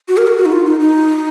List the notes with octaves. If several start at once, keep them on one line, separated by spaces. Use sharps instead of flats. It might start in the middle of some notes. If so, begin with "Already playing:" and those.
F#4
A#4
F#4
F#4
D#4
F4
D#4
D#4